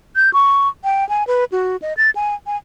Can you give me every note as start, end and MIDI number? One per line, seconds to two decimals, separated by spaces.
0.16 0.33 91
0.33 0.68 85
0.84 1.07 79
1.09 1.24 80
1.27 1.44 71
1.52 1.77 66
1.82 1.93 75
1.97 2.10 93
2.15 2.35 80
2.46 2.56 80